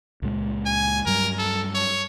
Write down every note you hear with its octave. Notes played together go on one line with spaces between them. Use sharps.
C#2 A#2 G#3
G#5
G2 F#3 G3 A#4
A4
C#5